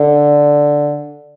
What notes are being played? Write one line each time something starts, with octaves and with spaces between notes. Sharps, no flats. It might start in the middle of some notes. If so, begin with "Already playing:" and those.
Already playing: D3